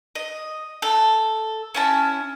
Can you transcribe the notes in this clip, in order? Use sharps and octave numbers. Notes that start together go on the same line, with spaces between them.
D#5
A4
C#4 E4 A5